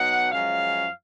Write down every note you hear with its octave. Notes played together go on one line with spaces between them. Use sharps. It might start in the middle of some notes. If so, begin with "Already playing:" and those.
Already playing: B2 F#3 B3 D#4 F#5
F#2 F3 G#3 C#4 F5